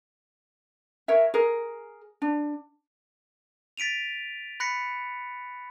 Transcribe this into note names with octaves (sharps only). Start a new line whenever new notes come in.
A#4 C#5 E5
G#4 A#4
D4
A6 B6 D7 D#7 F7
B5 F#6 A#6 B6 C#7